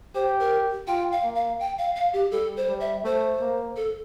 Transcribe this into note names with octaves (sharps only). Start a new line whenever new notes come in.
G4 C5
A#4
F4 G5
F5
A#3
F5
G5
F5
F5
G4
G3 A4
C5
G3
E5
A3 C5
A#3
A4